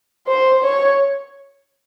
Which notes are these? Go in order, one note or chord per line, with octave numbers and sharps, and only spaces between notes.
C5
C#5